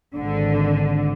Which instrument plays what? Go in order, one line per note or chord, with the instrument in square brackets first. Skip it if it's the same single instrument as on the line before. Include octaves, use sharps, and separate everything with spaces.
[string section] G#1 D3